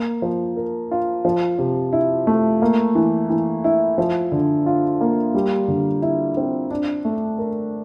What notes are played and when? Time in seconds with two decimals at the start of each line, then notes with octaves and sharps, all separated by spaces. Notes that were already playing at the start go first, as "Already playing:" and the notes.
Already playing: A#3
0.22 F3
0.56 A#4
0.91 F4
1.25 F3
1.59 C3
1.93 E4
2.27 A3
2.62 A#3
2.95 E3
3.30 E3
3.64 E4
3.98 F3
4.32 D3
4.66 F4
5.01 A#3
5.34 G3
5.68 D3
6.02 E4
6.37 C4
6.71 D4
7.05 A3
7.39 A#4